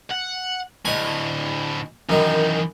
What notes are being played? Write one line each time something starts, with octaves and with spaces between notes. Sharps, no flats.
F#5
D2 A2 D#5 G#5
F#2 D#3 E3 D#4